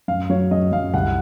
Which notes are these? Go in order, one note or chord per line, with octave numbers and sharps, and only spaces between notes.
F#2 F5
F#3 C#5
F#2 D#5
F#2 F5
C2 F#5